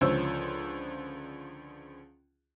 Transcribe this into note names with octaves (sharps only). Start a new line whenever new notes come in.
C#2 D3 F3 C5 C#5 E6